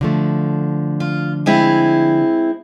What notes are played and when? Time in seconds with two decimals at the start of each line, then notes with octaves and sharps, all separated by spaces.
0.01 D3 F3 A3
1.00 F4
1.46 G#3 C4 E4